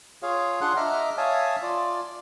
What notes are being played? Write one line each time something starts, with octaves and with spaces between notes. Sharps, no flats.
F4 G#4 C#5 F5
D4 F4 G#4 F#5 C6 F#6
D#5 E5 A#5 D6 F6
C#5 E5 F5 G#5 A5 D#6
F4 D5